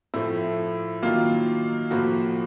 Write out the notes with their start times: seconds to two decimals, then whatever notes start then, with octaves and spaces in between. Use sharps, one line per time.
0.14 A2 F3 A3 E4
1.03 D#3 F#3 A#3 F4
1.91 A2 F3 A#3 F#4